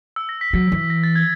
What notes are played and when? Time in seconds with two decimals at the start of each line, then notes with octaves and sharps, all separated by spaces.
0.16 E6
0.29 A#6
0.41 B6
0.53 F#3
0.72 E3
0.90 A#6
1.03 A6
1.16 G#6